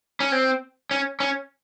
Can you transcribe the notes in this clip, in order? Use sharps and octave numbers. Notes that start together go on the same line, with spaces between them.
C#4
C4
C#4
C#4